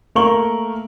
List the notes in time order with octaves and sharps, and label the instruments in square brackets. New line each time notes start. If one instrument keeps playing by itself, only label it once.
[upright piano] A3 A#3 A#4 C#6 F#7 G7